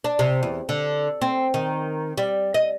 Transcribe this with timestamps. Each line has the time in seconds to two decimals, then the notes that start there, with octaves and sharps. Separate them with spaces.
0.04 D4
0.19 C3
0.43 E2
0.69 D3
1.21 C4
1.54 D#3
2.18 G3
2.54 D#5